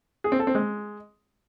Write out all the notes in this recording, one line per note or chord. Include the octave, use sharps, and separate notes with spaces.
G#4
C4
A4
C4
G#3